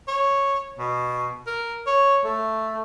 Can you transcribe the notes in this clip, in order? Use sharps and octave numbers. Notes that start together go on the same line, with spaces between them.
C#5
B2
A#4
C#5
A3